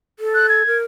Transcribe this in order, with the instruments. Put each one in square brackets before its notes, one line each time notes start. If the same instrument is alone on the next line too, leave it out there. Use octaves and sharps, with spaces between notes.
[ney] A4
[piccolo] F#6
G#6
[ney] A#4